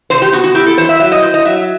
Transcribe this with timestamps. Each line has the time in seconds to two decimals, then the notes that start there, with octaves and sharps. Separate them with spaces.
0.10 C3 C5
0.22 G4
0.32 B3 F#4
0.44 F#4
0.55 E4 G4
0.66 A4
0.77 E3 C5
0.89 E5
1.00 F#3 E5
1.12 D#5
1.22 E4 C5
1.34 D#5
1.45 F#3 E5